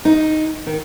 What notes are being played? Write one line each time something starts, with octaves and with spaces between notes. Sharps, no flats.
D#4
D#3